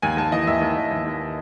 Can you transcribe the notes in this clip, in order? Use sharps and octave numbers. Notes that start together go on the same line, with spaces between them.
D#2 G#5
D#2 A5
E3 D#5
D#2 E5
D#2
D#2
D#2
D#2